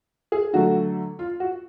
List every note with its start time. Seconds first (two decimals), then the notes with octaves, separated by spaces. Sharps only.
0.32 G#4
0.53 D3 F#3 A3 F#4
1.19 F4
1.40 F#4